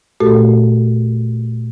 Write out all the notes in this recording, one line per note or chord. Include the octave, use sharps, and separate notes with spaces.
A#2 A3 F#4 G4 A4